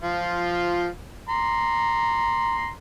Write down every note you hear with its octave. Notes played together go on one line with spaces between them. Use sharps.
F3 F4
A#5 C6